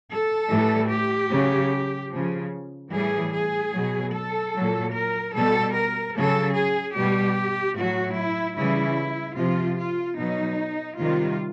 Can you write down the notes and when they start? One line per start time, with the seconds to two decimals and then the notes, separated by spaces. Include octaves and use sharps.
0.10 A4
0.50 A2 E3 G3
0.91 G4
1.31 C#3 F#3
2.11 F3
2.16 C#3
2.92 A2 E3 G3 G#4
3.33 G#4
3.73 B2 F#3
4.13 A4
4.54 A#2 F#3
4.94 A#4
5.35 B2 G3 A4
5.75 A#4
6.15 C#3 F#3 A4
6.55 G#4
6.96 B2 G3 G4
7.77 A2 F#3 F#4
8.17 E4
8.57 C#3 E3 G3 E4
9.37 C3 F3 F4
9.79 F4
10.18 B2 F#3 D#4
10.99 C3 D#3 G3 F4